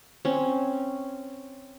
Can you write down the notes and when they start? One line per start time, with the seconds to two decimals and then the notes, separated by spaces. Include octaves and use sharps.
0.25 C4 C#4